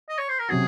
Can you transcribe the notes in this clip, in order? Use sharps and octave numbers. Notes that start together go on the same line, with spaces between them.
D#5
C#5
C5
A#4
C3 F#3 C#4 F#4 G#4